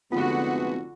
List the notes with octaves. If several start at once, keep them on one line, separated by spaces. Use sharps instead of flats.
F1 D3 G#3 A3 B3 F4 F#4